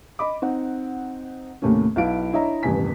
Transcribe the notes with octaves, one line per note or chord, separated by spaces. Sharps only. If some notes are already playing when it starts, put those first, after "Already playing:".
D#5 B5 D6
C4 D#4 F#5
D#2 A2 C3 A3 A#3 C#4
B1 E4 F5 D7
D4 E4 C#5 D#5 E5 A#5
D#1 A1 G2 C3 G#5 B6